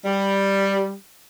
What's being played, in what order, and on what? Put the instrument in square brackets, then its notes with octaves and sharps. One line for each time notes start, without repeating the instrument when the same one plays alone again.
[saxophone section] G3